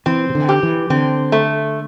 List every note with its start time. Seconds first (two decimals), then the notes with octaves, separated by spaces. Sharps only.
0.06 E3 C4
0.29 C3
0.35 D3
0.49 G4
0.63 E3
0.90 D3 C4
1.32 A3